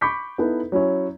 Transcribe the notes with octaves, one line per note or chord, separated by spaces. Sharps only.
B5 C#6 D6 G6 B6 C#7
B3 D#4 E4 A4 B4
F#3 C#4 E4 C#5